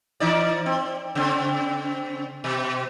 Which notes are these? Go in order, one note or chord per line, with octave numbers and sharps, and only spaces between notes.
E3 D#4 D5
C4
C#3 C4
B2